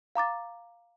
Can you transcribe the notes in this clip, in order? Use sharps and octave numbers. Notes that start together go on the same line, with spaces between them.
F5 A#5 D6 A6